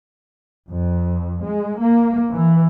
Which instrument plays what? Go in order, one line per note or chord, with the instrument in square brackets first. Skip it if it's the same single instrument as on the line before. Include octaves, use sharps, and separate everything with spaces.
[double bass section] F2
G#3
A#3
E3